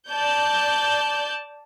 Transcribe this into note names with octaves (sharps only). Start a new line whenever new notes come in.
D5 A5 G6